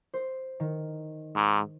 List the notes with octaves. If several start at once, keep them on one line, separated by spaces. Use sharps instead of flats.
C5
D#3
G#2